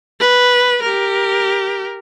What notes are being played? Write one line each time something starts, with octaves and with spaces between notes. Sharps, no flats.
B4
G4 A#4